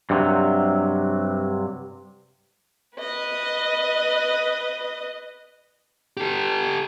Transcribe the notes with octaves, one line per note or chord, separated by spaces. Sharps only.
G2 C3 E3 F#3
B4 D#5
G4 A4